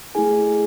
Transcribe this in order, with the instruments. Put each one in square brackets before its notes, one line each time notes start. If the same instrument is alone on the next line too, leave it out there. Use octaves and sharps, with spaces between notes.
[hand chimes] A3 E4 G#4 G#5